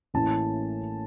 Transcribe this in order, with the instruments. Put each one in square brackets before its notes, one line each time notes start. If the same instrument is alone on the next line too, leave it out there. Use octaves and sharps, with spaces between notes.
[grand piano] A1 A2 E3 A#3 C#4 A5